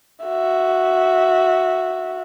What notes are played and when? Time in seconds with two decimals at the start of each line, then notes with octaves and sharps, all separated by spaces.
0.25 F#4 E5